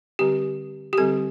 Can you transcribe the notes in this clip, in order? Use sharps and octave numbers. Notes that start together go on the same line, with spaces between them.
D3 G3 C4 G4
G4
D3 G3 C4 A4